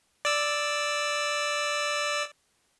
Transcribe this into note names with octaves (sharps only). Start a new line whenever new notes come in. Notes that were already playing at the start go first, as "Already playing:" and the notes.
D5 E6